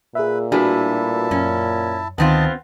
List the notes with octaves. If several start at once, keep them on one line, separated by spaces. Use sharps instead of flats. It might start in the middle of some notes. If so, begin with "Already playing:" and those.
A#2 G#4 B4 E5
A2 G3 D4 E4 F#4 G#4 B4 A5
F#2 C#4
D2 D#3 B3 C4 F4 D#5 A5 A6